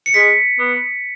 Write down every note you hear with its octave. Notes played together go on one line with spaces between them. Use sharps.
C#7
G#3 B6
B3